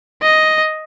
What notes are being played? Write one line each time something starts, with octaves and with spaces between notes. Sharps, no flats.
D#5